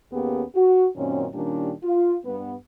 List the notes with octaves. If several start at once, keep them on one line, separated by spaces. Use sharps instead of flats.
D#2 A#3 B3 C#4 G4 G#4
F#4
F#2 A#2 D#3 C4 C#4
A#2 D#3 G3 C#4 D4 G4
F4
G2 B3